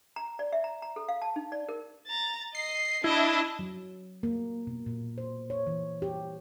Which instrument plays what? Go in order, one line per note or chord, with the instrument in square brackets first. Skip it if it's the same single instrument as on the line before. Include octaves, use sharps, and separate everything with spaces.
[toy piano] A#5
D5
E5
A#5
A#5
A4
F5
A5
D#4
D5
A#4
[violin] A#5 A6
[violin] D#5 [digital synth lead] C7
[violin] D4 D#5 [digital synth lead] E4
[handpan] F#3
A#3
B2
A#2
C5
C#5
E3
G4